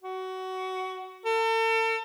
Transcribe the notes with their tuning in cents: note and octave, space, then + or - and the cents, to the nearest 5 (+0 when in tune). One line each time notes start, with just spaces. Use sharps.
F#4 +20
A4 +40